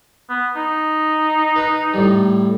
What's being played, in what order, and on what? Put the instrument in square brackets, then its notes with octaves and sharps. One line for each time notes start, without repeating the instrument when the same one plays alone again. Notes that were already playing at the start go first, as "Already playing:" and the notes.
[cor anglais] B3
D#4
[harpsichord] B4
A2 G3